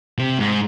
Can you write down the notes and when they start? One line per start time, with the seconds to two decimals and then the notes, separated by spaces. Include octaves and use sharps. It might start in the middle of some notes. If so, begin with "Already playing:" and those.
0.19 C3
0.39 G#2